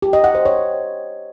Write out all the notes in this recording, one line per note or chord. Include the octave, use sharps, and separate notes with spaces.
G4
D#5
F#5
C5
C#5